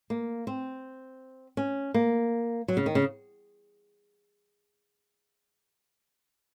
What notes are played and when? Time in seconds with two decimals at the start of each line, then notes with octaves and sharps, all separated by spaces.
0.10 A#3
0.47 C4
1.57 C#4
1.94 A#3
2.68 F#3
2.77 C#3
2.86 D#3
2.95 C#3